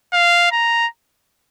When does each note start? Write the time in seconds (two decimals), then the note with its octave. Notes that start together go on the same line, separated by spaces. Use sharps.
0.13 F5
0.52 A#5